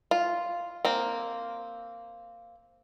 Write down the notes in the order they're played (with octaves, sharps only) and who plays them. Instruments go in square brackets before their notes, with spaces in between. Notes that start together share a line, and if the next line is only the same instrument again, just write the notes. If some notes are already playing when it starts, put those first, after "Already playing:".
[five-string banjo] F4
A#3 C4